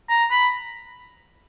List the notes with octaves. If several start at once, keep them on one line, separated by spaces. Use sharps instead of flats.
A#5
B5